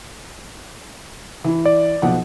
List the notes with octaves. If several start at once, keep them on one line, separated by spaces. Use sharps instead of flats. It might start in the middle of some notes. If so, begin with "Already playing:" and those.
E3 E4
D5
B1 F3 F#5